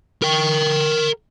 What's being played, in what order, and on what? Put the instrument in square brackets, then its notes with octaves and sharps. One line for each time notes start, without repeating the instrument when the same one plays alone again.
[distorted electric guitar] A#4 G5